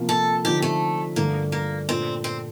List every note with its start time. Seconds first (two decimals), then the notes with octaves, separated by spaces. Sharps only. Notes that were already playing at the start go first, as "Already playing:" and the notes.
Already playing: C3 F3 A#3
0.09 A4
0.44 D3 F3 C4 D#4 G4
0.62 A3
1.16 G2 D3 A3 A#3
1.52 A#3
1.88 A#2 A3 C4 D4
2.24 C4